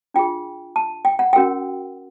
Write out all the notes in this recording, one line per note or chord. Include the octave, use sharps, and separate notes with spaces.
D4 F4 G#4 G5
A5
G5
F#5
C#4 F#4 A#4 G5